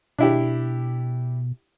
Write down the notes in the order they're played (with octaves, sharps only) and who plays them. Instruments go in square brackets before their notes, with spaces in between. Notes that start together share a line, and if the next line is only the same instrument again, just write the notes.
[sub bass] B2 [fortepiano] D4 E4 G4